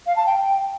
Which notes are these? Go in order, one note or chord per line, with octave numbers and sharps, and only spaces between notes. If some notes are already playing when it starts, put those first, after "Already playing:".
F5
A5
G5